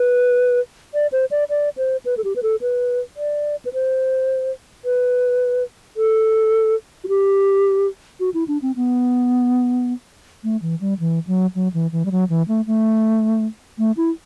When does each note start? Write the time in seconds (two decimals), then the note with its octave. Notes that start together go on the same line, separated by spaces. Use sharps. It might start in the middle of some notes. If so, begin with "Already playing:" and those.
Already playing: B4
0.94 D5
1.12 C5
1.31 D5
1.50 D5
1.77 C5
2.05 B4
2.17 A4
2.24 G4
2.36 B4
2.43 A4
2.61 B4
3.17 D5
3.65 B4
3.73 C5
4.85 B4
5.97 A4
7.04 F#4
7.09 G4
8.20 F#4
8.34 E4
8.48 D4
8.62 C4
8.76 B3
10.44 A3
10.62 E3
10.81 G3
11.00 E3
11.27 F#3
11.55 F#3
11.74 E3
11.92 E3
12.05 G3
12.11 F#3
12.30 E3
12.48 A3
12.67 A3
13.79 A3
13.97 E4